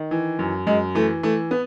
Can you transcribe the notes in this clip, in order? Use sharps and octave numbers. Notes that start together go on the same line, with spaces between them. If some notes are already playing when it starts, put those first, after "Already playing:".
Already playing: D#3
E3
F#2
F#2 G#3
E3 A3
E3 A3
B3